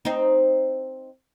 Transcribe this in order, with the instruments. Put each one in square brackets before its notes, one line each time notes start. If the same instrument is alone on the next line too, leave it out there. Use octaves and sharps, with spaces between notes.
[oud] C4 D#4